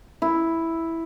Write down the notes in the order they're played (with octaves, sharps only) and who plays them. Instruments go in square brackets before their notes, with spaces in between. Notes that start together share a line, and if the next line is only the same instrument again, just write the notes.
[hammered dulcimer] E4